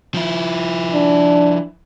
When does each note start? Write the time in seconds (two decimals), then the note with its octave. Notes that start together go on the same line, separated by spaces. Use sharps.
0.14 F3 E4
0.94 D4